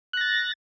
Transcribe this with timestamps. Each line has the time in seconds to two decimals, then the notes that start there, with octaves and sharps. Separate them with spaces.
0.13 F#6
0.17 A#6
0.21 A6